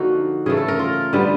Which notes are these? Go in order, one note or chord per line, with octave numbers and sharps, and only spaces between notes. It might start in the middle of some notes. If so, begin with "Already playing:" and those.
Already playing: D3 F3 A#3 D#4 F#4
C#3 E3 A3 G#4
A4
A#4
F4
D3 G3 B3